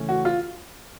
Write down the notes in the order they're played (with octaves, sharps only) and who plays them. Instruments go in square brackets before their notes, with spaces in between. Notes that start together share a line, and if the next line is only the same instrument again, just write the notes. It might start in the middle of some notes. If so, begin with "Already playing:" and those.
Already playing: [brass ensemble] C#3 E3 A3 C#4
[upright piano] F#4
F4